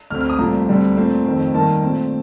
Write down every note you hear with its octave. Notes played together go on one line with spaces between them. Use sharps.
D2 D3 A3 C4 F6
F6
D#6
C2 A#2 F3 A3 C4 A#5
D2 D3 G3 C4
A#2 A3 C4
F2 D#3 A3 C4
G2 D#3 A#3 A5
A#2 A3 C4